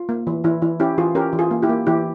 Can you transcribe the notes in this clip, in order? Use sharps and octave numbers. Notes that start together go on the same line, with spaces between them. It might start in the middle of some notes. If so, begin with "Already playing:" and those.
Already playing: F4
A#3
E3
E3 E4
E3 E4
C#4 E4 G4
E3 F4 G#4
C#4 G4 A#4
E3
F4 G#4
A#3
E4 G4
A#3
E3 E4 G4